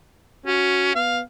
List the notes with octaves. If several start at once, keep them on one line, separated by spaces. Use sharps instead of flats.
C#4 F#4
B3 F5